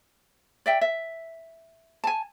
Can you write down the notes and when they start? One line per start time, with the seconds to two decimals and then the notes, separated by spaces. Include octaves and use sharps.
0.66 D5 E5 G5
0.81 E5
2.04 G#5 A5